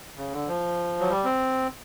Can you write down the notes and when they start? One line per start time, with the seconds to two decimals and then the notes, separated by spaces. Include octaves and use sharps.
0.17 C#3
0.32 D3
0.48 F3
1.00 F#3
1.10 G3
1.24 C4